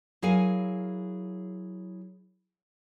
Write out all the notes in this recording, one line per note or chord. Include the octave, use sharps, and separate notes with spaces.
F#3 E4 G#4 A#4 F5 G#5